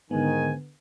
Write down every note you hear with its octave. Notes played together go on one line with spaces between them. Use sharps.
G#2 D3 D#3 B3 G#5